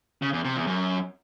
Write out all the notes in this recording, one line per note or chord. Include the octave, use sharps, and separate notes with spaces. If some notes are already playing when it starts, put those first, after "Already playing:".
C#3
E2
C3
E2
F#2